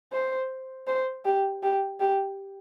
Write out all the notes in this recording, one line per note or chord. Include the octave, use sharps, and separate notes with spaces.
C5
C5
G4
G4
G4